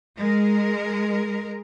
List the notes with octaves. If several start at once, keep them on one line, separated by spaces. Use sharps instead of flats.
G#3 A#4